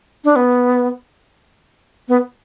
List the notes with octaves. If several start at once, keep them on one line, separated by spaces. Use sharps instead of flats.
D4
B3
B3